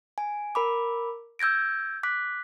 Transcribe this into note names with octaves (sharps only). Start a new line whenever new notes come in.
G#5
A#4 B5 D6
E6 G6 G#6 A#6 D7
D6 F#6 B6